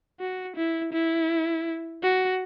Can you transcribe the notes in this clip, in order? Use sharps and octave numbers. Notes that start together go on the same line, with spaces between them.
F#4
E4
E4
F#4